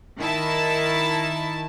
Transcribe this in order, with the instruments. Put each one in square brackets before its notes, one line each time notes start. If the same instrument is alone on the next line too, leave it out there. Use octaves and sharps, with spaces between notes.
[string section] D#3 E4 A5